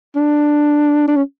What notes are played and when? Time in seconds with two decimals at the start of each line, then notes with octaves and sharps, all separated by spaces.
0.16 D4
1.08 D4
1.16 C#4